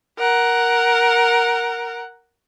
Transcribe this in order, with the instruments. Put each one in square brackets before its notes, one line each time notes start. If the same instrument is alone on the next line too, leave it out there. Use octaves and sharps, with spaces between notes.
[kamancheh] A#4 F#5